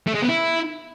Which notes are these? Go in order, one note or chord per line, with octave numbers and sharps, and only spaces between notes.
A3
G#3
B3
E4